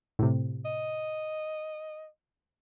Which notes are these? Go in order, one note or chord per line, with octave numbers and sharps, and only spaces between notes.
A2 C3
D#5